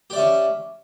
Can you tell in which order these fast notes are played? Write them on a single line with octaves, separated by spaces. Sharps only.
G4 D5 E5 C#4